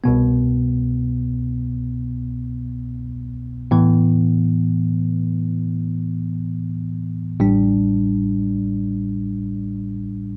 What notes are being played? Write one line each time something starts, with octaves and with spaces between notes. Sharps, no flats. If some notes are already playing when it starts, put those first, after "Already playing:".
C2 B2 B3
A2 E3 B3
A1 A2 G3 D4